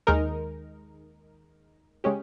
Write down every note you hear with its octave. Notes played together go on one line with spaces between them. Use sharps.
D#2 D#3 G#3 D#4 A#4
C#3 G#3 C#4 G4